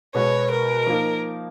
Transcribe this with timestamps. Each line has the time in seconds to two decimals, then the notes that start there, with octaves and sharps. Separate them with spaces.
0.15 B2 G#3 B3 F#4 B4 C#5
0.51 A#4
0.87 F3 A#3 D#4